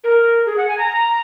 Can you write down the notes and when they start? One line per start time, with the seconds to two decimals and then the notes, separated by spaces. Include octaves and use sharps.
0.04 A#4
0.46 G#4
0.57 F#5
0.68 G#5
0.78 A#5